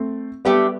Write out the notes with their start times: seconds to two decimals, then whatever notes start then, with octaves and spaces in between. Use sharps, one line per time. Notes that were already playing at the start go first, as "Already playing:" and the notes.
Already playing: A3 C4
0.45 G3 A3 B3 D4 G4